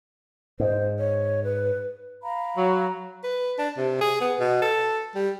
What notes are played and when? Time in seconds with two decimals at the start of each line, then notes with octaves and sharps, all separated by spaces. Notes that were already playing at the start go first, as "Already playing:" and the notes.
0.60 G#2 C5
0.99 C#5
1.44 B4
2.22 F5 A#5 B5
2.57 F#3
3.24 B4
3.58 D4
3.77 C3
4.01 G#4
4.21 B3
4.39 B2
4.62 A4
5.15 G3